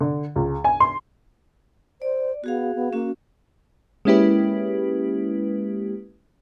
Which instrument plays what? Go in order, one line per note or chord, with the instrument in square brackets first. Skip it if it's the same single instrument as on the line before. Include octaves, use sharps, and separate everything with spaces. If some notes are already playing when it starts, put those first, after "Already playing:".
[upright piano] D3
C#2
G#5
C6
[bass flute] C5 [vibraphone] D5
[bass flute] B3 [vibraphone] F#4 G#4 F5
[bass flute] B3
[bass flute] A#3 [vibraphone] C#4 F#4
[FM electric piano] G#3 A#3 C#4 E4 G4 B4